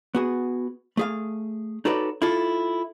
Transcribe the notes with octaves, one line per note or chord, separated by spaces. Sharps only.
B3 F#4 G#4
A3 G#4 F5
D#4 F#4 A4 B4 C#5 D5
E4 F4 A4